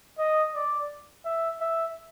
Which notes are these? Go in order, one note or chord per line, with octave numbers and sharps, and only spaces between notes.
D#5
D5
E5
E5